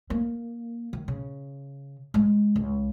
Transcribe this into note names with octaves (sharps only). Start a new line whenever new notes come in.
A#3
D#3
C#3
G#3
C#2